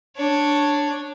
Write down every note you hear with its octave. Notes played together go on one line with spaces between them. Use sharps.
D4 C#5